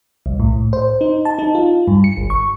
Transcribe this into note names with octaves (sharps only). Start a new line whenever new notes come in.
C2
A2
C5
D#4
A5
D#4
F4
G2
C#7
G1
C#6